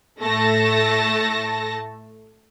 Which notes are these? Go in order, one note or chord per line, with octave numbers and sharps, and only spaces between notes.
A2 A3 A4 A5 A#6